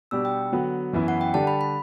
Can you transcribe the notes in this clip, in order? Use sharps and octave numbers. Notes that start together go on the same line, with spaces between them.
B2 G3 D4 G4 E6
G5
D3 F#3 B3 F#4
F#2 E3 B3 E4
F#5
G5
D3 G3 D4 G4 A5
B5
B5